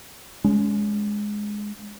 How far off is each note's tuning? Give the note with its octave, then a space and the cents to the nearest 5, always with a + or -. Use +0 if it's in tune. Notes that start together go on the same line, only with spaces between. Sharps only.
G#3 +0 C#4 +30